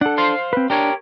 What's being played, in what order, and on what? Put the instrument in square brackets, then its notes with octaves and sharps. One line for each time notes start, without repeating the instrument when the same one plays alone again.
[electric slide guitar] D4 A4 [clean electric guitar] F#5
[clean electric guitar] C5 F5 C6
[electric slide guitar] C4 B4
[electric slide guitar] D4 [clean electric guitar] G4 A#4 C#5